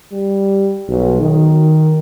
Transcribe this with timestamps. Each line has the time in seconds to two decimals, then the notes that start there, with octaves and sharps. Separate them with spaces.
0.12 G3
0.89 B1
1.21 D#3